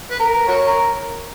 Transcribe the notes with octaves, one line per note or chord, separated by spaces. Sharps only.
B4
A#4
F#4 A#4 C#5
A#4